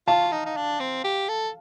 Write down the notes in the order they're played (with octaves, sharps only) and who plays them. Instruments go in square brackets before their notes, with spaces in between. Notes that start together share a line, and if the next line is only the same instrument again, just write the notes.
[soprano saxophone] F4 [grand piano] F5 A5
[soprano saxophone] D#4
D#4
D4
C4
G4
A4